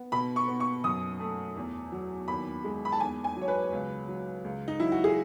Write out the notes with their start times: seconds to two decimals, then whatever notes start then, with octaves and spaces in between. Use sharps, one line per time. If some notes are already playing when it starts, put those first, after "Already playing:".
Already playing: B3
0.12 B2 B5
0.36 C#6
0.48 B3
0.60 C#6
0.84 F#2 D#6
1.20 A3
1.56 E2
1.92 F#3
2.28 D#2 B5
2.64 G#3
2.85 B5
2.92 A5
3.00 E2 G#5
3.24 G#5
3.36 F#3
3.41 C#5
3.48 B4
3.72 C#2
4.08 F#3
4.44 C#2
4.68 D#4
4.80 F#3 E4
4.92 F#4
5.04 G#4